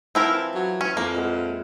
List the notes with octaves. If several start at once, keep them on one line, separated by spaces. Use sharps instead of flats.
E3 F3 C4 E4 A#4
F#3
C#4
F2 A#3
A#2 G#3 F#5